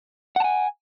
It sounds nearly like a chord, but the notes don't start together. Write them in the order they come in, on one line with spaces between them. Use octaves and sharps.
F#5 A5 G#5